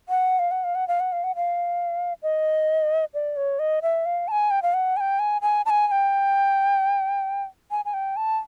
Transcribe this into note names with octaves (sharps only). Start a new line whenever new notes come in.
F#5
F5
F#5
F5
F#5
F5
F#5
F5
F#5
F5
D#5
D5
C#5
D#5
E5
F5
A5
G#5
G5
F5
F#5
G#5
G5
G#5
G#5
A5
G#5
G#5
G5
G#5
G#5
G5
A5